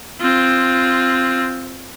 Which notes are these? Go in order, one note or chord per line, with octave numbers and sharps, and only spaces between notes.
C4 F4